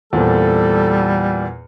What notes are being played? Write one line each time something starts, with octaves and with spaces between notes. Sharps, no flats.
E2 A#2 G3 C4 A4